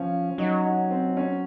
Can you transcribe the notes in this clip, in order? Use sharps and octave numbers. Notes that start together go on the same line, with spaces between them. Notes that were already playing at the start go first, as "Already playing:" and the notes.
Already playing: F3 C#4
F#3 D#4
D#4
C4
C#4